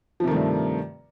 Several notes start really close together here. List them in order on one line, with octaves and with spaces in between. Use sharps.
F3 C3 D#3 A3 G2